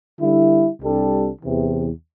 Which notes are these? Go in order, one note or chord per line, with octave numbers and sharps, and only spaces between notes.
D3 G3 E4
C2 C3 G3 D4 A4
E2 C3 E3